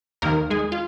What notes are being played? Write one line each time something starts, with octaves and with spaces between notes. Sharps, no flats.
D#2 D#3 A#3 A#4
G#3 G#4
F4